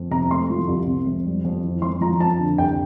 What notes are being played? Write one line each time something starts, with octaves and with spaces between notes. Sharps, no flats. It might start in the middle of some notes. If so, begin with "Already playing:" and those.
Already playing: F2
C3 A#5
A3 C6
F3
C2
C3
F2
G3
F2
E3
F2 C6
F3 A#5
F2 A5
D3
C2 G5